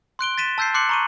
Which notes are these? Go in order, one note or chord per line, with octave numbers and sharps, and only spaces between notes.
C6 F#6 D7 G7
A6 B6 D#7 E7
A5 E6 G6 A6 C7
C6 D6 F#6 C7 C#7 F#7
A#5 C#6 D#7